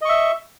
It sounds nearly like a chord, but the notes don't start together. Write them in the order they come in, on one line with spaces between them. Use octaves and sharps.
D#5 C#6 E5